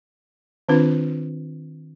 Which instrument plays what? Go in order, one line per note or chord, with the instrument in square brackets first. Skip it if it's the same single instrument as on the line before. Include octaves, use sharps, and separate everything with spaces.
[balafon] D#3 C4 D4 F4 B4